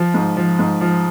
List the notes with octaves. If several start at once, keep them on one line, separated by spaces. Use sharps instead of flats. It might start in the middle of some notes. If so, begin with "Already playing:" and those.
Already playing: F3
G#2
F3
G#2
F3